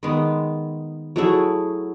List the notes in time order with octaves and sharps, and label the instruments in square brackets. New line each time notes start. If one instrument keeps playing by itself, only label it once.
[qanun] D#3 G#3 B3
F#3 A3 E4 G#4